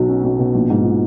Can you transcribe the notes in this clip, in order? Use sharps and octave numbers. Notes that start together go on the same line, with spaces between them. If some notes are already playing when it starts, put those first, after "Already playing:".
Already playing: B1 B2 F#3
C#4
B1
B2
A#1
G#2
F3